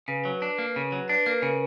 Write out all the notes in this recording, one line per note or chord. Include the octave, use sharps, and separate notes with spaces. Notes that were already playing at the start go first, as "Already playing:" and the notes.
C#3 B4
F#3
D4
A#3
C#3
F#3
D4 B4
A#3 A#4
C#3 A#4